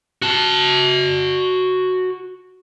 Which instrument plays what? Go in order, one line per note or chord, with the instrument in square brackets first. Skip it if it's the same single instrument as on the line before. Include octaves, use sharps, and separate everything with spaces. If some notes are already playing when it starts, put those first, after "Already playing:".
[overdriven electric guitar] F#4 A5